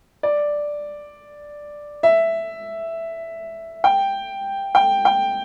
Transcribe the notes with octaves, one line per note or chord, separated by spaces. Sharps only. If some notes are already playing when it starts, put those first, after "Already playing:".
D5
E5
G5
G5
G5